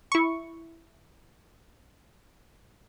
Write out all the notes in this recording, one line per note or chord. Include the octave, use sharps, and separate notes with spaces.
E4 C#6